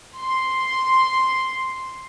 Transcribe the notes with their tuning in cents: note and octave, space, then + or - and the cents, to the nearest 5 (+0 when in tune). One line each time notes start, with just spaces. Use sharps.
C6 +0